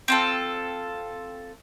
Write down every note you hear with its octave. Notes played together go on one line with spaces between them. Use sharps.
C4 F4 A4